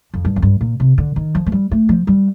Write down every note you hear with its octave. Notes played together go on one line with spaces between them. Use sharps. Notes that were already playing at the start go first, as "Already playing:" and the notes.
F2
G2
F2
G2
A#2
C3
D3
D#3
F3
A3
G3
A3
F3
G3